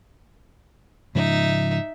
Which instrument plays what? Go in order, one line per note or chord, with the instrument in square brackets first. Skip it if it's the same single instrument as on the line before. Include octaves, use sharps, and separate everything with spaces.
[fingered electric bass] G#2 C#3 F3 [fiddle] D#4 E5